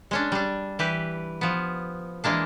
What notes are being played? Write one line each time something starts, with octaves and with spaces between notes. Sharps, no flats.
G#3 C#4 D4
G3 D4
E3 G4 B4
F3 B3
E3 G#3 A#3 D4